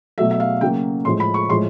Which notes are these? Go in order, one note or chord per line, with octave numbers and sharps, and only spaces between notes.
B2 F#3 A3 E5
E5
F5
C#3 F#3 A#3 G5
A2 F3 G#3 C6
B5
C#6
A2 F3 G#3 C6